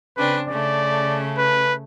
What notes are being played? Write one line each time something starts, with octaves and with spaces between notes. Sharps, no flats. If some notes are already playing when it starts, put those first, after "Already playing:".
C#3 C4 D4 B4
C#3 A3 D5
B4